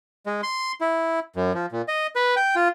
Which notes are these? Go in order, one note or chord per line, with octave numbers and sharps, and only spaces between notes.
G#3
C6
E4
F#2
F3
A#2
D#5
B4
G5
F4